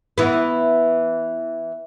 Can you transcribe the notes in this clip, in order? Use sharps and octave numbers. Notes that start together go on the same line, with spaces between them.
E3 B3